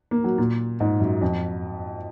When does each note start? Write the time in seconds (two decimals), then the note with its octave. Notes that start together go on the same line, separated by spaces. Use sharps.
0.11 A#3
0.24 F#3
0.38 A#2
0.80 G#2
1.00 F#2
1.22 F2